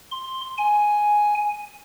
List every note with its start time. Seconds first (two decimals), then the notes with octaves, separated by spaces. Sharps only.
0.12 C6
0.58 G#5